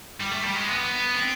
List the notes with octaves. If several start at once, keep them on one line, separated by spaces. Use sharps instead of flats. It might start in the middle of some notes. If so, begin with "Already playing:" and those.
G3
A3
G3
G#3
B3
C4